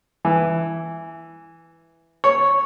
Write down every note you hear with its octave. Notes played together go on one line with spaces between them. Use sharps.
E3
C#5